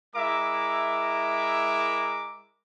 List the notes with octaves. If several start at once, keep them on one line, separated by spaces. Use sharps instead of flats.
G#3 E4 A#4 E5 D6